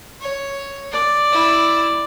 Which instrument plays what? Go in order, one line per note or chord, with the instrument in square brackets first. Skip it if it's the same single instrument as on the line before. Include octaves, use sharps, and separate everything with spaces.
[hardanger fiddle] C#5
[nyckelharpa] D5
[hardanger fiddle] E4